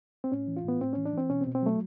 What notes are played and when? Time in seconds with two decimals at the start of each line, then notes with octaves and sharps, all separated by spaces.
0.24 C4
0.32 A2 C#4
0.48 E3
0.57 F4
0.64 A2 B3
0.80 A2 C4
0.93 E3 C#4
1.06 D4
1.13 E3 C4
1.30 B2 C#4
1.41 C4
1.46 B2
1.55 C4
1.62 F#3 A3